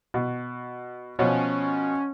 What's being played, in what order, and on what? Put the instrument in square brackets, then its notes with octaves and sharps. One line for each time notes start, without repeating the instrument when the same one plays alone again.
[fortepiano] B2
[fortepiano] B2 F3 [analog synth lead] C#4